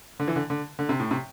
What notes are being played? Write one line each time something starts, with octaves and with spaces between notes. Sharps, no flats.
D3
E3
D3
D3
D3
C3
A2
C3